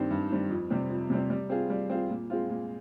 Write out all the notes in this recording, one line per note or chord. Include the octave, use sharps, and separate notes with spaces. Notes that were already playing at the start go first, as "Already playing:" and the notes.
Already playing: G2 D#3 G3 C4
G2
D#3 G3 C4
F2
C3 G3 C4
F2
C3 G3 C4
G3
C4 F4 G#4
G3
C4 F4 G#4
A#2
G#3 C4 F4
A#2